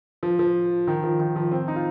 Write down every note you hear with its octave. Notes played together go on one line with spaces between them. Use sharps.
F3
F3
D#3
F3
D#3
F3
C4
D#4
F4